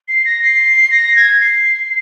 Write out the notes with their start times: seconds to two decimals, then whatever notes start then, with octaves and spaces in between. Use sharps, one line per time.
0.08 C7
0.25 A#6
0.42 C7
0.91 A#6
1.16 G#6
1.41 C7